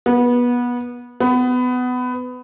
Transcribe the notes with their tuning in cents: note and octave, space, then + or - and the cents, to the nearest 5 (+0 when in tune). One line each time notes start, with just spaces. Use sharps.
B3 -20
B3 +20